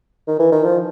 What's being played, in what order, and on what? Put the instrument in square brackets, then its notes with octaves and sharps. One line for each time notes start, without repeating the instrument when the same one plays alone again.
[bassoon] D#3
E3
D#3
F3